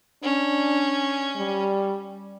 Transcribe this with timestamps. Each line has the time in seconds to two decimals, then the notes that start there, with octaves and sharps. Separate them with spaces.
0.23 C#4 D4
1.36 G3